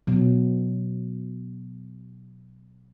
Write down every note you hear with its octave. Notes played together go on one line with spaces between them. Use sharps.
B2 F#3